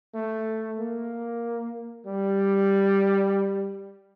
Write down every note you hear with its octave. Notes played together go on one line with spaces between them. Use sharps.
A3
A#3
G3